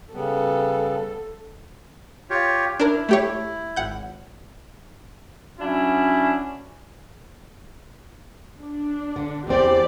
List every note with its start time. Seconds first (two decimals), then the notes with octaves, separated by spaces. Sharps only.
0.13 C#3 G3 B3 A4
2.30 F4 G4 C#5
2.80 D4 E4 A#4
3.09 A3 G4 C#5
3.76 G#1 F#5 G6
5.59 F#3 C#4 D4 E4
8.62 D4
9.16 D3
9.47 E2 C4 G4 D5